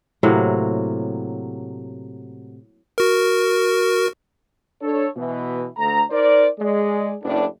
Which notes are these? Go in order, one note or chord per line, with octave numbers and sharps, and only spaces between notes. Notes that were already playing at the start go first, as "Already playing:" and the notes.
A2 C3 F#3 A#3
F#4 A#4
D4 A4 C#5
B2 E3
D2 A#5
D#4 A#4 C5 D5
G#3 G#4 D5
F#1 A2 D4